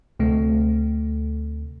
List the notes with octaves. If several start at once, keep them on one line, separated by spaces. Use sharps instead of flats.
D2 C3 A3